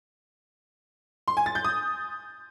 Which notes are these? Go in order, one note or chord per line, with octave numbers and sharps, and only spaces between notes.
C6
G#5
A6
G6
D#6